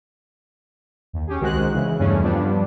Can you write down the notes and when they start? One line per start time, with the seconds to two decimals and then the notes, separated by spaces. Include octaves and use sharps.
1.13 D#2
1.27 C#4 G4 G#4
1.40 C2 D#3 G#3 F#4 C5 F#6
1.74 C#3 E3
1.99 E2 G2 C#3 A3 C#4
2.23 G2 F3 G3 B3 D4